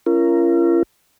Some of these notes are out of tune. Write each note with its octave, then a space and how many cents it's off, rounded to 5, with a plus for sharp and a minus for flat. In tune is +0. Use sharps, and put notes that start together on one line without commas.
C#4 +0 F4 -45 A#4 +0